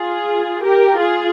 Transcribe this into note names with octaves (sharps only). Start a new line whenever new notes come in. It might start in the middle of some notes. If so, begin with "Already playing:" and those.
Already playing: F4 G#4
G4 A#4
F4 G#4